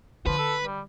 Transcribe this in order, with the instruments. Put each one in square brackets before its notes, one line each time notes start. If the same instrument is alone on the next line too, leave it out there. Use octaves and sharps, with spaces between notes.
[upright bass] D3 [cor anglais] F3 [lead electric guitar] B4
[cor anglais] A4
G3